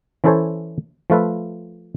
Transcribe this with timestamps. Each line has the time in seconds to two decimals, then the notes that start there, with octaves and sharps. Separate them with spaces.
0.24 E3 C#4 E4 A4 C5 C#5
1.10 F3 A3 F4 B4 E5